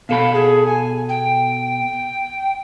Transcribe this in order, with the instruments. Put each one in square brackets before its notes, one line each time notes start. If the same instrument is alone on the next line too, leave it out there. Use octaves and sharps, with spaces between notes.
[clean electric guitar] B2 A4 B5 [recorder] F5
[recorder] G#4
G#5
G5